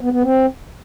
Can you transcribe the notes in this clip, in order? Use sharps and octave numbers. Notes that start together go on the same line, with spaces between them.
B3
B3
C4